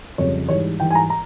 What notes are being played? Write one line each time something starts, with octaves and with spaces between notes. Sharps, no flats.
F2 C#3 G3 C#5
G#2 E3 G3 C#5
G#2 E3 G3 G5
G#5
A#5
A#5